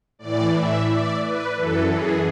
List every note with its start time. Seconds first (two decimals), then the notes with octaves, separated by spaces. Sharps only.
0.19 A2 E3 D5
0.54 E5
0.87 D5
1.22 B4
1.56 F#2 E3 A4
1.90 G#4